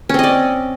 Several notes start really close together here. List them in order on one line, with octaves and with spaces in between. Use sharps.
C#4 C4 D#5 D5